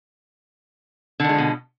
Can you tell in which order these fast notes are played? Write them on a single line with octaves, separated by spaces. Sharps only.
D3 D#3 G#3 F3 B2